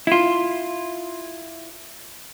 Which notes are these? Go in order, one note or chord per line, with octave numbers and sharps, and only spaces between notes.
E4 F4